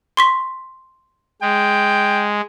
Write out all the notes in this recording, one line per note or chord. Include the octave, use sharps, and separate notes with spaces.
C6 C#6 B6
G#3 G5